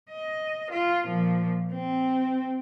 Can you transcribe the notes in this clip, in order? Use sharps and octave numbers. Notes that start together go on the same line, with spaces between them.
D#5
F4
A#2 F3
C4